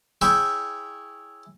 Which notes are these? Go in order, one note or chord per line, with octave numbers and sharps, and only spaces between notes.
E4 G#4 C#5 E5 G5 B5